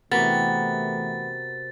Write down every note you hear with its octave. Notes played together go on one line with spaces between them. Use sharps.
C3 E3 A3 B3 F#4 A#4 A6